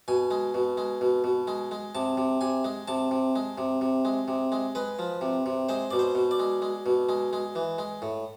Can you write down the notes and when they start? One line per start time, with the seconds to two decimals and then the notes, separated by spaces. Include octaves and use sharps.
0.08 B2 G#5
0.31 G#3
0.54 B2
0.77 G#3
1.01 B2
1.24 B2
1.47 G#3
1.71 G#3
1.95 C3 A5
2.17 C3
2.41 C3 G#5
2.65 G#3
2.88 C3 A5
3.11 C3
3.36 G#3
3.58 C3
3.81 C3
4.05 G#3
4.28 C3
4.52 G#3
4.75 G#3 B4
4.99 F3
5.21 C3
5.46 C3
5.69 G#3 C5
5.91 B2 D5
5.99 C5
6.15 B2
6.31 D5
6.39 G#3
6.62 G#3
6.86 B2
7.09 G#3
7.33 G#3
7.55 E3
7.78 G#3
8.02 A2